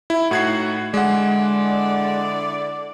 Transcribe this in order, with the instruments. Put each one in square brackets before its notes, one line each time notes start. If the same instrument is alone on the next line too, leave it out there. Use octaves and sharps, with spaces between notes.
[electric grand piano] E4
[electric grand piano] A2 G#6 C7 [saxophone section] D#4 E4 F#4
[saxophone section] D3 E4 D5 [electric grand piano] G#3 F#5